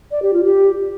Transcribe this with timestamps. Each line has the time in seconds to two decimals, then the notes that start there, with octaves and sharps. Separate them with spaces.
0.11 D5
0.22 G4
0.33 F4
0.45 G4